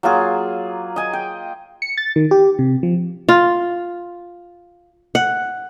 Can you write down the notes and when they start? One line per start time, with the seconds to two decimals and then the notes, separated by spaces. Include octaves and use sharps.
0.03 F#3 A#3 F4 G#4
0.96 D#5 G#5
1.13 G5
1.82 C#7
1.98 A6
2.16 D#3
2.31 G4
2.59 C3
2.83 F3
3.29 F4
5.15 F#5